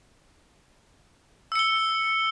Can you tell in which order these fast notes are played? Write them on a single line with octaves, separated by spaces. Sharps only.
E6 C#7 G7